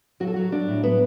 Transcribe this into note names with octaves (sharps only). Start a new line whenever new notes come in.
F#3 F#4
A4
F#3 F#4
F#3 D4
A2
F#3 B3